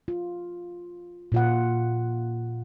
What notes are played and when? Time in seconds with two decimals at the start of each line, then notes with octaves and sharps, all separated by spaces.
0.08 F4
1.32 A#2 F4 F#5